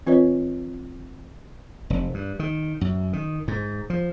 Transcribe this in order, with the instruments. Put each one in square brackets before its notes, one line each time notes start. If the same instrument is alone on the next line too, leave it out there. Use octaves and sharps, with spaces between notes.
[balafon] E3 C4 F4 B4 C#5 D#5
[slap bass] F1
G2
D#3
F#2
D#3
G#2
F3